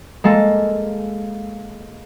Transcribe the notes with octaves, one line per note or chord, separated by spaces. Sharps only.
G#3 A#3 A4